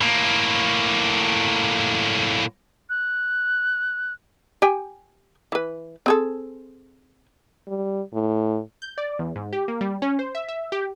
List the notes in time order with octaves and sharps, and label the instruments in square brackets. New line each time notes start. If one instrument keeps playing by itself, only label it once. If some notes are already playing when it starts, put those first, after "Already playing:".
[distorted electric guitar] A2 A#3
[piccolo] F#6
[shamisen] G4 G5 G#5
E3 B4
C4 G#4 A4
[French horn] G3
A2
[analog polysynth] G6
D5
E2
G#2
G4
A#3
G3
C#4
C5
E5
E5
G4